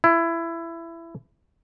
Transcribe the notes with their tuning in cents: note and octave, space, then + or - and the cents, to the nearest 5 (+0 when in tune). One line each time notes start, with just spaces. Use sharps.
E4 +20